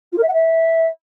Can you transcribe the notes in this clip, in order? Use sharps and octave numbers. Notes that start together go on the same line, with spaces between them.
F4
A#4
E5
F#5
E5